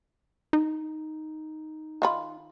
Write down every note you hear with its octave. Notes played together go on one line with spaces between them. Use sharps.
D#4
D#3 F4 B5